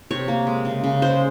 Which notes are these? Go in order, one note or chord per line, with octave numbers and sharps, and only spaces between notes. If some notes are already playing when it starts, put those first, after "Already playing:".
C3 C#5
A#3
G#3
C#3
C#3
G#3 C5